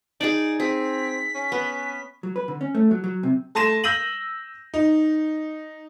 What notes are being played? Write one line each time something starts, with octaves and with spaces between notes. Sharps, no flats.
D#4 G#4 D5
C4 G#4 B6
C#4
B3
F#3
B4
D3
C#4
A3
F#3
F#3
C3
A3 A5 C6 A#6 D#7 E7
E6 G6 A#6 D#7 F#7
D#4